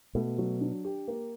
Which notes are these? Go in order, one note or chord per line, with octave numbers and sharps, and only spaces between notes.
B2 A3
F#3
D4
G4
A#3